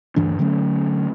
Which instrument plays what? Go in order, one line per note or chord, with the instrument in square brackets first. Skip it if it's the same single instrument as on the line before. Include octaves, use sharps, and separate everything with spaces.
[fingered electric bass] D2 G2 E3 D4
D3 F#3 A3 C#4